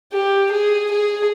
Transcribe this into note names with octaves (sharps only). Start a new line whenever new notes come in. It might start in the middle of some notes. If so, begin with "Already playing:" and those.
G4
G#4
G#4